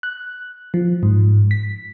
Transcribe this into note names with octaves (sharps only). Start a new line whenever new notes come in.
F#6
F3
G#2
B6